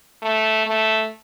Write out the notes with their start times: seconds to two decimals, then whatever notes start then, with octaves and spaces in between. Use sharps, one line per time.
0.22 A3
0.67 A3